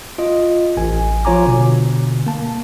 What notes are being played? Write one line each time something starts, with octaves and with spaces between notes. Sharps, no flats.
F4 D#5
A1 G#5
F3 F4 C#5 G#5 A#5 D6
B2 D3
A#3 A5